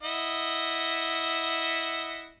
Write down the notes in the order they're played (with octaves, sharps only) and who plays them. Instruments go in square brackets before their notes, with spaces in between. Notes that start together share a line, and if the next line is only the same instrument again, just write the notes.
[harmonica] E4 D#5 F#5